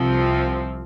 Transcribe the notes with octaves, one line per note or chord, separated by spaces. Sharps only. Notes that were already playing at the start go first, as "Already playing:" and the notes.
Already playing: C2 C3 F3 C4